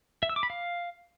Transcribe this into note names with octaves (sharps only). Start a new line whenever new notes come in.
E5
E6
D6
B5
F5